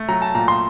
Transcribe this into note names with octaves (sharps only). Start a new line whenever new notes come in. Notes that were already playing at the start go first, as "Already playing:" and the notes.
Already playing: A3
F#3 A#5
A5
A#2 A#5
C6